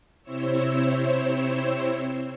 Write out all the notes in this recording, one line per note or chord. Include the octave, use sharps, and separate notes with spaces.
C3 C4 E4 C5 C#5 E6